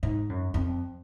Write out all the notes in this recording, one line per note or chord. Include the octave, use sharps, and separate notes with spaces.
G#2
F#2
F2